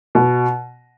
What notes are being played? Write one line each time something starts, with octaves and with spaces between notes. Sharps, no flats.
B2